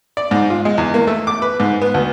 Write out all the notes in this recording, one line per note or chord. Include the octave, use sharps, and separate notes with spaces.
D5
G#2
F4
G#3
E2
A#3
A3
D6
B4
G#2
B3
D2